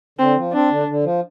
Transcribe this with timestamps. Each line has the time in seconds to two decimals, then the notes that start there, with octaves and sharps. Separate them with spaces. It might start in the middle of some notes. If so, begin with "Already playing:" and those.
0.19 D3 C4
0.36 F3
0.52 C4 D4
0.71 D3
0.88 D3
1.04 F3